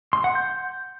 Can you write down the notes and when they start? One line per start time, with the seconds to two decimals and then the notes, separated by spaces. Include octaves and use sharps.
0.13 C6
0.24 F#5
0.35 G6